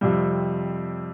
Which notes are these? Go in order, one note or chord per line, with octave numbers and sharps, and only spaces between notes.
F2 C3 G3